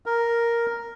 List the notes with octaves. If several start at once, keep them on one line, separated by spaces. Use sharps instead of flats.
A#4